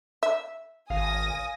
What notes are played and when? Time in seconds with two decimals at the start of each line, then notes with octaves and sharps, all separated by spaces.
0.23 E5
0.90 G#1 F5 G#5 D#6 A#6